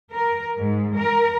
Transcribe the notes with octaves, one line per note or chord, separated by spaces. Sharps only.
A#4
G#2
A#4